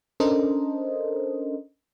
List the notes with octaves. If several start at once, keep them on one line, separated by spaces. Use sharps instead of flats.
C#4 D4 A4 A#4 C5 D#5